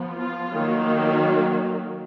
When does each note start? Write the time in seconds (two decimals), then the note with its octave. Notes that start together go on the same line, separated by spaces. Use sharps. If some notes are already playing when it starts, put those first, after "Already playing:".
Already playing: F3 B3
0.16 F4
0.49 D#3 F#3 A#3